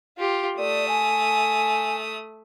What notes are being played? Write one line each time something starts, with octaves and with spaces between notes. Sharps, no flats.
F4 G4
A3 D5 D#6
G#5